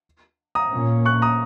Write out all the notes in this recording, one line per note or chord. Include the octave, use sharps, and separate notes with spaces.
A#5 D#6
A#2 A#3 C#4
C#6 F#6
A#5 D#6